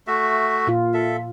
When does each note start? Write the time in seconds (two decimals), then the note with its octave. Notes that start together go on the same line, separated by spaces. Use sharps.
0.07 A3 F#4 E5
0.67 A#2 F4
0.94 A4 E5